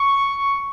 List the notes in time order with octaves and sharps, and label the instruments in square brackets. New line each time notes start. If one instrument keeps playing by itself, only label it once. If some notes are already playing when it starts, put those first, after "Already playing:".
Already playing: [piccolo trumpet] C#6